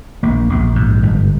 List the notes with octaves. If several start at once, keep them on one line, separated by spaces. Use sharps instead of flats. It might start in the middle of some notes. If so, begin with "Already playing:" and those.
A#1 A#3
A#1
G#2
G1